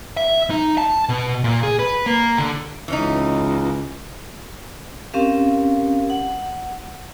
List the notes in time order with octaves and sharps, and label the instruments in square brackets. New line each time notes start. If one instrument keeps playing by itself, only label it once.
[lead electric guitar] E5
D#4
A5
B2
A#2
G#4
B4
A#3
D3
[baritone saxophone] C#2 [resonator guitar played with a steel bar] E3 C#4 D#4
[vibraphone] C4 C#4 G4 A#4 F5
F#5